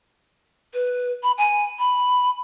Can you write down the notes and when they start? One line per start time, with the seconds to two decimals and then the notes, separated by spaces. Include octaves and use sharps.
0.74 B4
1.23 B5
1.38 G#5
1.79 B5